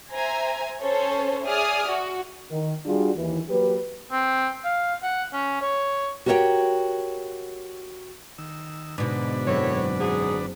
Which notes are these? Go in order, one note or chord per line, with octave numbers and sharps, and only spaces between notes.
C5 E5 G#5 A#5
C#4 A4 C5 C#5
G#4 D5 E5 G#5 D#6 F6
F#4
D#3
G3 D4 F4 F#4 G#4
D#2 E3
F#3 A#3 G4 B4
C4
F5
F#5
C#4
C#5
F#4 G4 A#4 C5 C#5 G5
D#3 E6
G#2 B2 D3 D4 B4
F#1 C4 E4 A4 C#5
F#3 F#4 G#4